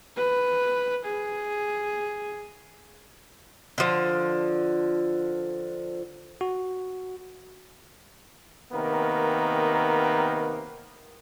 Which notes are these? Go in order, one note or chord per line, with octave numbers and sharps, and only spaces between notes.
B4
G#4
D3 F3
F#4
C3 D#3 A#3 B3 A#4